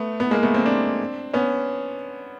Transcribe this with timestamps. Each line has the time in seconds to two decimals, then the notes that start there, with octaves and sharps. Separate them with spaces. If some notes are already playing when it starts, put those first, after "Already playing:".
Already playing: A3 B3
0.20 B3
0.31 G#3 A#3
0.43 A3 B3
0.54 A#3 C4
0.66 C4 D4
1.33 B3 C#4